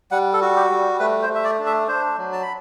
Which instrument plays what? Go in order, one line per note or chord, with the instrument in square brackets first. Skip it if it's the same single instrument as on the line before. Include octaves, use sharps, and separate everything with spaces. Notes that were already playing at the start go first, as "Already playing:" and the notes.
[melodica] G3 F#5
A4
F#4
G4
G3
A3 B4
C5
A3
E5
D5
D4
E5
D4 C5
F#3
A5
B5